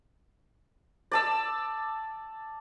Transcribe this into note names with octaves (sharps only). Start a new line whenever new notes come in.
D5 A5 E6